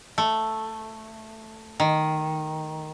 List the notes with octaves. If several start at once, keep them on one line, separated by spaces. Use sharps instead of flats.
A3
D#3